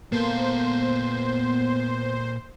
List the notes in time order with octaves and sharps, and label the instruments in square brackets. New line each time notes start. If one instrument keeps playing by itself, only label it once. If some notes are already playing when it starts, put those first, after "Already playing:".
[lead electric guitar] A#2 A4 [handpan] A#3 [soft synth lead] B3 [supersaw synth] C5